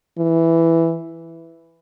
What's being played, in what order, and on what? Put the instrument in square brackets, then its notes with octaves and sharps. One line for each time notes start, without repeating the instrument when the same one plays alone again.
[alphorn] E3